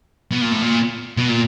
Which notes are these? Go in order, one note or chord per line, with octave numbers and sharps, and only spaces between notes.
B2
A#2
A2
A#2
B2
A#2